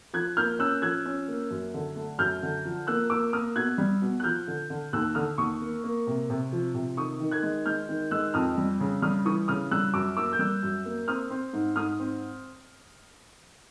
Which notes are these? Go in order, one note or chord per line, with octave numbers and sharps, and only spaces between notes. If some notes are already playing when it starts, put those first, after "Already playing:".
F3 F#6 G#6
A#3 F6 G6
C#4 E6 F#6
F3 F#6 G#6
C#4
A#3
F#2
D3
A3
F#2 F6 G6
D3
F3
A#3 E6 F#6
A#3 D6 E6
A#3 D#6 F6
B2 F#6 G#6
G3
B2
F#6
F3 F6 G6
D3
D3
D#2 E6 F#6
D3 D#6 F6
D#2 C#6 D#6
A#3
A#3
C3
C3
F3
C3
D#3 C#6 D#6
D#3
F#6 G#6
G#3
G#3 F6 G6
D#3
G#3 E6 F#6
F2 D#6 F6
G3
C#3
G3 D#6 F6
E3 C#6 D#6
C#3 D#6 F6
G3 E6 F#6
F#2 D6 E6
A#3 D6 E6
G6
G3 E6 F#6
F#2
A#3
C4 D#6 F6
C4
G#2
G#2 D#6 F6
C4